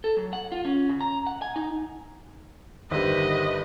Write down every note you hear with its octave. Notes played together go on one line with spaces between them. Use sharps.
A4
F#3
F#5
F4
C#4
C#3
A#5
F#5
G#5
D#4
G1 D#3 G3 B4 C5 D#5 E5